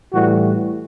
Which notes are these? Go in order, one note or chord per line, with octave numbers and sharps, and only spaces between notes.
A2 E3 G3 F#4